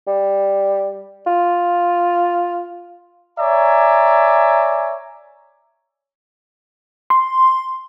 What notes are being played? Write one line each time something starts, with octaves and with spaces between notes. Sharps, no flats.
G3
F4
C#5 D5 E5 G#5 A#5
C6